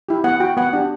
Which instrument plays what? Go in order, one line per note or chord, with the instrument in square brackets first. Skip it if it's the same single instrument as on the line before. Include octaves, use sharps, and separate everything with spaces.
[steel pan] E4 G4
B3 F#5
F#4 G5
B3 F#5
D4 G4